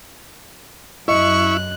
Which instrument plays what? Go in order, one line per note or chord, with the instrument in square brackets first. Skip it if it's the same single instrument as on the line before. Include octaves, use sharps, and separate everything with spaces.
[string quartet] F#2 F#6 [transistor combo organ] E4 [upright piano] D#5 [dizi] C#6